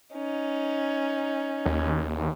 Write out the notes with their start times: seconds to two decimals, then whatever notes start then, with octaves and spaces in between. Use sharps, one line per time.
0.14 C#4 D#4
1.66 D#2